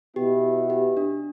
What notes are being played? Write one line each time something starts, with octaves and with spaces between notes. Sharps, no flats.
B2 B3 E4 G4
G4
D4